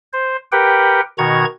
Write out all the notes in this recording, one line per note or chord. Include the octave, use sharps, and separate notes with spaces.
C5
G4 A#4 B4 F#5 G5
B2 D#3 F#4 A#5 C#6 G#6